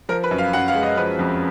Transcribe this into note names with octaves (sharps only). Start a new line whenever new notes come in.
F3 A#4
B4
F#2
F5
F#2 F#5
F5
G#3
D#5
F3 B4
F2